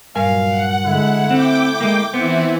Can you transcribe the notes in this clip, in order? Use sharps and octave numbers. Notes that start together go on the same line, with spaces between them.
G2 A#2 F#3 A#4 F5 G#5
F#5
D3 G#3 E4
A3 C4 G5 D6
G#3 A#3
E3 B3 C4 E4